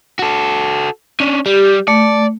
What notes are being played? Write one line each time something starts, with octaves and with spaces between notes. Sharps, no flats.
F#4 A4
C#4 D4
G3 G4
A3 D5